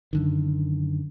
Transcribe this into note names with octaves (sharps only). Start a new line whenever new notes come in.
F#2 D3 D#3